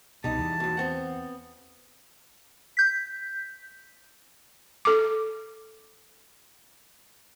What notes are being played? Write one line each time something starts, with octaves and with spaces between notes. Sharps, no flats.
C2 B2 G3 D#4 A5
E2
D#2 B2
B3 C4 F#5
G6 B6
A4 D6